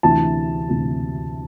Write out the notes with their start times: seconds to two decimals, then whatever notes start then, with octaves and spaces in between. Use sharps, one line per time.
0.03 D2 C3 E3 A5
0.69 D2 C3 E3